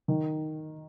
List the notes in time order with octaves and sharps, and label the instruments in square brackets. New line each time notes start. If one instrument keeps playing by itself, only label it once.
[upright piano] D#3